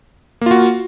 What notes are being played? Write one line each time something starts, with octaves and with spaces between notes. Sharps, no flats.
A#3 F4 F#4